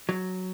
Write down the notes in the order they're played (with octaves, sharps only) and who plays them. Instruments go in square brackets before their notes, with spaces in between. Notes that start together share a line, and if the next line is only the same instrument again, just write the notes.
[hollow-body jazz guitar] F#3